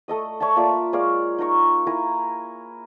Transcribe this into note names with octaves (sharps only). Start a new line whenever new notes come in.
A3 A4 D#5 D#6
C#5 D5 E5 A5
A#3 F4 D5 E5
G#3 C#5 D5 F5
D#4 A#4 A#5 C#6
E4 A#4 G#5 A#5